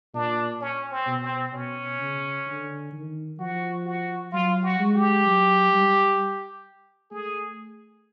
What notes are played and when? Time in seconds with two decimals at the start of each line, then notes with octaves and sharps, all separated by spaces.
0.14 A#2 D4
0.61 C#4
0.91 C4
1.07 B2
1.23 C4
1.54 B2 C#4
2.00 C#3
2.47 D3
2.93 D#3
3.39 F3 F#4
3.85 F#4
4.32 F#3 F4
4.63 F#4
4.80 G#3
4.95 G4
5.26 F#3
5.73 G3
7.11 A3 G#4